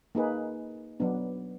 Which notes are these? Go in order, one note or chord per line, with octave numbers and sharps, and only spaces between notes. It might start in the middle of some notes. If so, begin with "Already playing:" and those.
A#3 D#4 G#4 B4
F#3 B3 D4